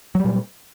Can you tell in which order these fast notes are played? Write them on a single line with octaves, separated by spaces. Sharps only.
F#3 G3 A#2